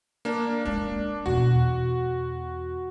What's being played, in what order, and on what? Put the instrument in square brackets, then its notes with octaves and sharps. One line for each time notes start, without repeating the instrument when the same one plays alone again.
[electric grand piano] A#3 D4
[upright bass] G#3 A#3 [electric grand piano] D4
[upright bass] E2 B2 [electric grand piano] F#4